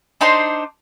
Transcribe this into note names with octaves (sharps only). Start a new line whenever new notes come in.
D4 D#4 C5 C6